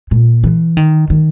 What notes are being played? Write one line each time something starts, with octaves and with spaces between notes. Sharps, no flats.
A#2
E3
D#3
D#3